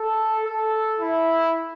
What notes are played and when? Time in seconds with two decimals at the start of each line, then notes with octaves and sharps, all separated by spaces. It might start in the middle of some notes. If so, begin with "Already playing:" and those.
Already playing: A4
0.44 A4
0.99 E4